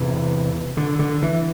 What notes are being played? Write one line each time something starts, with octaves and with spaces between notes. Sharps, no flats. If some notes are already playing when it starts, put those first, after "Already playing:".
Already playing: E2 C3 E3
D3
D3
E3